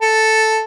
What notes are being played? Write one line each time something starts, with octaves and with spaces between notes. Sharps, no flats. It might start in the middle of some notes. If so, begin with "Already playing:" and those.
A4